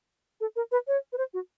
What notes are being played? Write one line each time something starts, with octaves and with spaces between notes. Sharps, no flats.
A4
A#4
B4
C#5
B4
C5
F#4